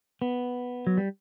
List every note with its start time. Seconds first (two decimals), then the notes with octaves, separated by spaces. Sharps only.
0.22 B3
0.87 F#3
0.97 G3